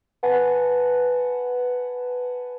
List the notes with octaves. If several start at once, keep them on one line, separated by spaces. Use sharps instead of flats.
B4 F#5 G#5 A5